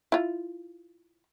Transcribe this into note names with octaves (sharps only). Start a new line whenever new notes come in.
E4 F4